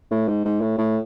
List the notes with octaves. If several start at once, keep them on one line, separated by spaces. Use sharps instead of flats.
A2
G#2
G#2
A2
A2